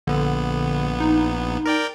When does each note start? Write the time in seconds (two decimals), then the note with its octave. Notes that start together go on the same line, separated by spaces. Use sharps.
0.07 A#1 D3 B3
1.00 D#4
1.66 A#4 D5 G5